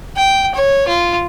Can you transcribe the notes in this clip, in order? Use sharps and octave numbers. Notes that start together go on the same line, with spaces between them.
G5
C#5
F4